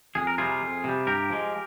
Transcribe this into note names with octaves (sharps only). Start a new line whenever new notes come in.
F2 G#4
A#4
C3 G3 F4 G#4
F2
C3 G3
G2 G4 A#4
F3 G#3